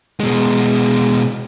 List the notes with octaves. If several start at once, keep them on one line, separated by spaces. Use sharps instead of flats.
B2 G#3